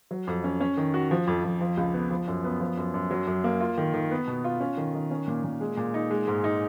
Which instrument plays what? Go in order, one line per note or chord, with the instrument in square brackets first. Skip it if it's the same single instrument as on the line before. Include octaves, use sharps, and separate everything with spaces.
[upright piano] F#3
F2
C#4
C#4
D#3
F#4
F3
F2
F2
F3
C#2
B3
F3
F#2
B3
F3
F#2
F#2
F#3
F#2
A#3
F4
D#3
D#3
B3
B2
F4
C#4
D#3
D#3
C#4
A#2
A#2
G#3
A#2
D#4
G#3
G#2
D#4